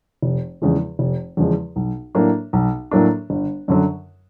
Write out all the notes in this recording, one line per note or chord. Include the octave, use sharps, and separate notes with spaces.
F1
E2 C#3 F3 G#3
F1
E2 C#3 F3 G#3
B1
A2 F#3 A#3 D4
B1
A2 F#3 A#3 D4
G1
F#2 D3 F#3